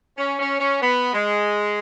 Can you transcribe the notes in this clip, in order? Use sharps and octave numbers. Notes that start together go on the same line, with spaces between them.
C#4
C#4
C#4
B3
G#3